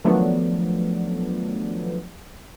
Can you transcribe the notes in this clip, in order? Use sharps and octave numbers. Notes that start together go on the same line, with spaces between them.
D#3 F3 F#3 A3 B3 D4